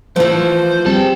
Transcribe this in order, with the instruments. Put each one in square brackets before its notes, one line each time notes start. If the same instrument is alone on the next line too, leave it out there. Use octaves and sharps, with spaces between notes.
[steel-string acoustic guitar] E3 A3 [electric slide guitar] F3 F4 [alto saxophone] C5
[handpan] G3 C4 [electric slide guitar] G#4 A5